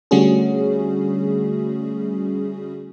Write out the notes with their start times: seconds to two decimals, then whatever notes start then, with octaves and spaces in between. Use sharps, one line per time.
0.11 D3 G3 A3 C#4 F#4 G#4